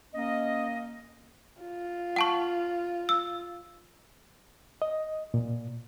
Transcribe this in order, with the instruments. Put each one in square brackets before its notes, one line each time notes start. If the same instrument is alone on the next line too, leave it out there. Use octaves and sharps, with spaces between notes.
[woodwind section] A#3 C#4 D#5
[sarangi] F4
[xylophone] F#5 A5 C#6
E6
[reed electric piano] D#5
A#2